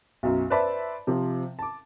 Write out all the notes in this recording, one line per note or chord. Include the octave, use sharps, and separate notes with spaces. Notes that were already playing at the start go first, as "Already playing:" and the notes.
B1 F#2
B4 C5 D5 E5 A5 B5
C3 F3
A5 D6